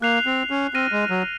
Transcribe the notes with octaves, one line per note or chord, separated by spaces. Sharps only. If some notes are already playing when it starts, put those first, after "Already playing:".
A#3 F#6 C7 F7
C4
C#4
C4 F6 A#6 D#7
G#3
F#3